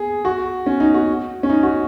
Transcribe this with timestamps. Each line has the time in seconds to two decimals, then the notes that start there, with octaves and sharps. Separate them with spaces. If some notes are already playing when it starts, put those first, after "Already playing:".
Already playing: G#4
0.25 F#4
0.66 C#4
0.80 D#4
0.94 F#4
1.43 C#4
1.50 D#4
1.63 F#4